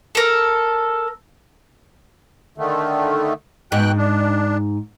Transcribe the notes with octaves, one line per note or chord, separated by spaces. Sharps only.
A4 A#4
D3 D#3 A3
G#2 B2 G5 F#6
D4